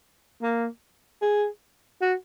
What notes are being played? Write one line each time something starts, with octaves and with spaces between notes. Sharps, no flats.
A#3
G#4
F#4